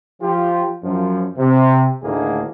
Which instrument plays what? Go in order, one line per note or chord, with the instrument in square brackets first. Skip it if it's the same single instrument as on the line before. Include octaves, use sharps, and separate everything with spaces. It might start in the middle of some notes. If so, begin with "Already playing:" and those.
[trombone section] F3 F4 G4
F#2 F3
C3
D2 A2 D3 D#3 A#3 G#4